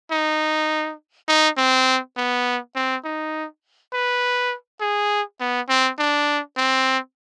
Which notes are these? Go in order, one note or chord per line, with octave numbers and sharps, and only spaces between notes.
D#4
D#4
C4
B3
C4
D#4
B4
G#4
B3
C4
D4
C4